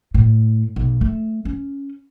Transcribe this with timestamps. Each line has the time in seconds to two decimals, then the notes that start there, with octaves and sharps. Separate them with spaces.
0.14 A2
0.76 B1
1.01 A3
1.45 C#4